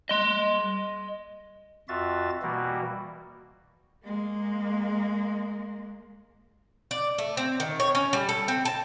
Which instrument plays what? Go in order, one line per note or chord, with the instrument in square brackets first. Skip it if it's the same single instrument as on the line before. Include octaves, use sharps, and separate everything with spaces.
[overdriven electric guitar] D#5 C6
[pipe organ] F2 F4 F#4 E5 A6
B2 E3 G3 A#3 F#4
[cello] G#3 A#3
[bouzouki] D5
A3
C4
D#3
C#5
C#4
G3
A4
C4
A5